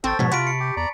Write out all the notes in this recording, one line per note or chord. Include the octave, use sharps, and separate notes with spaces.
G#1 C4 A4 C5 G5 A5 C#6 A6
G#2 B2 F3 F#4 C#5 B6
C3 F4 F#4 B5 B6 D7
C#7
G4
E2 D5 A#5